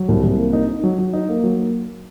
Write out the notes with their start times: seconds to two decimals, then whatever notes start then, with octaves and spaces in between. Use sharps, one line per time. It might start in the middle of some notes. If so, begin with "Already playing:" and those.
Already playing: F#3
0.08 C2
0.23 C2
0.38 A#3
0.53 D#4
0.68 D#4
0.83 F#3
0.99 F#3
1.13 D#4
1.29 A#3
1.44 F#3
1.59 A#3